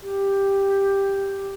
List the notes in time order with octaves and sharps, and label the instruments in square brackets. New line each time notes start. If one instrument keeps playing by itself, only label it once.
[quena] G4